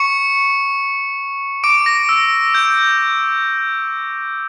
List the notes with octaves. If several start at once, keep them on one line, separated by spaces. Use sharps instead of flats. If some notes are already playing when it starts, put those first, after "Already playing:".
Already playing: C#6 C#7
D6 D7
A#6
E6
G6